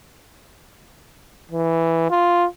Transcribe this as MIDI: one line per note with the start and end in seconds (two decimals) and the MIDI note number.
1.52 2.09 52
2.10 2.45 65